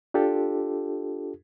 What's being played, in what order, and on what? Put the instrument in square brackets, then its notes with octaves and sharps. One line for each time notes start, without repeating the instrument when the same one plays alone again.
[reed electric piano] D4 F4 G4 A4